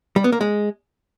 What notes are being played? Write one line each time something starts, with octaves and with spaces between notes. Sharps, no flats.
G3
B3
A#3
G#3